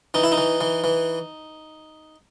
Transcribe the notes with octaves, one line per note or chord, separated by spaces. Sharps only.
E3 D#4
E4
D#4
E3
E3
E3